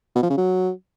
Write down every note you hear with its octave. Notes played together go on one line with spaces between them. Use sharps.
B2
F3
C#3
F#3